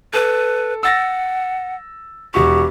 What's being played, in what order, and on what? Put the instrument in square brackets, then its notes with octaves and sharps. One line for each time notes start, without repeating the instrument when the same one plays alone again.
[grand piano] A4 [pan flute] B4
[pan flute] F#5 [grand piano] E6 A6 A#6
[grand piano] E1 F#4 C#6 [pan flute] G4